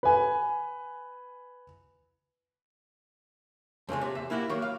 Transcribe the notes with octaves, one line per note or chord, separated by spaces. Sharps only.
B4 G#5
F2 C#3 F3 G#3
C3
E2 E5
A#3 E4 F#4 G4
D#3 F#3 A#3
F5